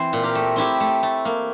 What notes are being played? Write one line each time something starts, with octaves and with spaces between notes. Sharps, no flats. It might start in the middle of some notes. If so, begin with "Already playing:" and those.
Already playing: E3 C4 C5
A#2
G4 A#4
A3
C4 E4 G4
A3
A3
A#3